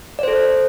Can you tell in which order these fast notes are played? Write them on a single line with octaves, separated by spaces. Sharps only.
D5 C5 A4